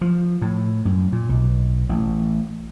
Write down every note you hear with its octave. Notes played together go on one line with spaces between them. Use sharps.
F3
A2
F#2
A#2
B1
A1